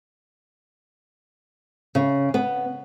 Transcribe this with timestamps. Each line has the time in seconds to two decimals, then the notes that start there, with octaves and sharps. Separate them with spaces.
1.95 C#3
2.34 B3